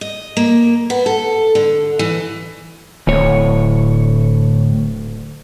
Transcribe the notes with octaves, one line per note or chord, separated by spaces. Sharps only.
D#5
A#3
B3
A4
D3
E3
D1 D2 A2 C#5